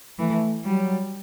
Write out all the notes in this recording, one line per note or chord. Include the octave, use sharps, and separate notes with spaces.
E3 A3
F#3 G3